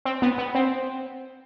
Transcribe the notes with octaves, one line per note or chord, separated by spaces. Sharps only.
C4
B3
B3
C4